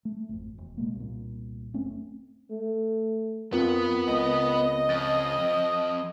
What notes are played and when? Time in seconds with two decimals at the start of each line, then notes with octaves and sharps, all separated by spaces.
0.05 A3
0.29 G#1 F2
0.58 E1
0.77 B2 G#3 A#3
0.96 C2 A#2
1.74 F#1 A3 C4 C#4
2.50 A3
3.53 F2 B3 C4 F4 A#4
4.08 C#2 D#5
4.89 F2 A6